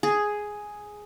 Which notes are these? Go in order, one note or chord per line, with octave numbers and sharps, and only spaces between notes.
G#4